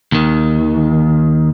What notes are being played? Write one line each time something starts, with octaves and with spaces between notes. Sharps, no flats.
D#2 D#3